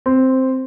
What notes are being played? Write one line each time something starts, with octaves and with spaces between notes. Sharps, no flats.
C4